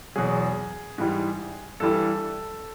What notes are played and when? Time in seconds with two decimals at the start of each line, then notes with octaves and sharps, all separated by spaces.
0.16 E2 B2 F#3 G#4
0.98 G#2 E3 G3
1.80 G2 E3 G3 A4